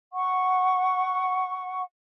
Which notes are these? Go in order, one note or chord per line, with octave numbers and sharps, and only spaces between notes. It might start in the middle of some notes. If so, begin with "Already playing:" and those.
F#5 C#6